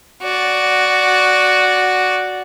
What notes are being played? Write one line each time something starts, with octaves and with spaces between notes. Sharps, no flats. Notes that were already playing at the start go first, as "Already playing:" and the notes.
F#4 D5